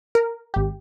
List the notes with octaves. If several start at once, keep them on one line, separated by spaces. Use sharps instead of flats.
A#4
G#1 G4